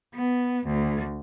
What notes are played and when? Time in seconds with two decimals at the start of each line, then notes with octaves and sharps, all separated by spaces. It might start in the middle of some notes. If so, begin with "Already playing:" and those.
0.14 B3
0.67 D2